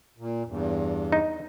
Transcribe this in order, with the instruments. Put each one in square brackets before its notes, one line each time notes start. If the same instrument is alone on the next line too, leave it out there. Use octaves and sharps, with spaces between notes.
[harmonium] A#2
E2 G2
[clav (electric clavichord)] D#4